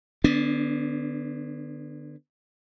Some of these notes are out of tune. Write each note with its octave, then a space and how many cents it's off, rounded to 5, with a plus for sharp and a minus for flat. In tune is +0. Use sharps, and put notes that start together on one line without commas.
D3 +30 B3 +15 D4 -25